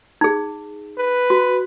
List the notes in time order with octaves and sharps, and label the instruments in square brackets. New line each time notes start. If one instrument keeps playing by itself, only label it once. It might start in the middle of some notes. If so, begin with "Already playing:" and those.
[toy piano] D#4 G#4
[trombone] B4
[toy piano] F#4